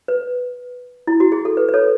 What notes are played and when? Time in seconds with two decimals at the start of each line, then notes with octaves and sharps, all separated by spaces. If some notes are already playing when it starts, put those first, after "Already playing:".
0.08 B4
1.07 E4
1.20 F#4
1.32 G#4
1.45 A4
1.57 B4
1.69 B4
1.74 A4 C#5